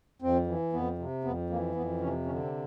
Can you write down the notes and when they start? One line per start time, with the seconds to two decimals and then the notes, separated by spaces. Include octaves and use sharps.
0.22 F2 C4
0.47 E3
0.73 F2 B3
0.98 C3
1.24 F2 B3
1.50 E3 A#3
1.75 F2 B3
2.00 C3 C#4
2.26 D3 C#4
2.43 C4